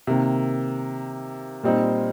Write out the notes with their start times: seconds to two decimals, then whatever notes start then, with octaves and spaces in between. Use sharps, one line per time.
0.07 C3 D#3 A#3
1.63 A#2 G3 C4 D#4